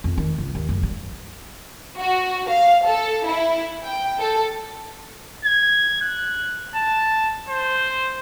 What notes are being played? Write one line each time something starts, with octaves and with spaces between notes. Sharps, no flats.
F2
D#3
C#2
D#2
F#1
G3
F#4
F5
A4
E4
G5
A4
G#6
F#6
A5
C5